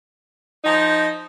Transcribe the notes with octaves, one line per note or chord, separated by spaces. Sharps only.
F3 D#4